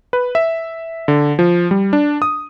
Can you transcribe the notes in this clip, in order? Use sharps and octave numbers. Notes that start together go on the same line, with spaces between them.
B4
E5
D3
F3
G3
D4
D#6